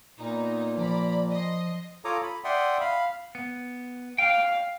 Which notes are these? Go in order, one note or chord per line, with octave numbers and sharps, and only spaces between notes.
A#2 B3 D#4
F3 D5 A#5 B5
D#5 C6
F4 A4 C#5 A#5 D6 D#6
B5
D5 E5 F#5 G5 C6 D#6
F5 B5
B3
F5 G5